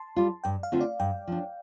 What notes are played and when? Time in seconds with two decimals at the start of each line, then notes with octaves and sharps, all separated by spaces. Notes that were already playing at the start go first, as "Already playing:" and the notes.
Already playing: A5 C6
0.16 G3 F4
0.44 G2 G5
0.63 F5
0.72 D3 A3 C4 F4
0.81 D5
1.00 G2 G5
1.27 F3 D4